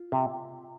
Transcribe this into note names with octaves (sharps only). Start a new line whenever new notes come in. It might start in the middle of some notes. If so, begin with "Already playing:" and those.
Already playing: F4
C3